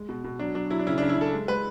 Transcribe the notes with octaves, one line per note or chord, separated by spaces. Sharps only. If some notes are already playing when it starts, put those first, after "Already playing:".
Already playing: G#3
B2
B2
F#3 D4
F#3 D4
F#3 E4
D4
C#3 E4
C#3 D4
E4
C#3 A4
G#3
G#3 B4